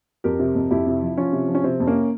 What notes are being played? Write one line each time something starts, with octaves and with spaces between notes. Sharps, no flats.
F2 G4 A#4
C3
F2
F2 E4 G4
C3
F3
F3 C#4 F4
C3
F3
C#4
C3 C4
F2
A#3 C#4